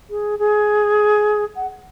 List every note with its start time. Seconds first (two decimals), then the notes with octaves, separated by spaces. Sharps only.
0.10 G#4
0.39 G#4
1.56 F#5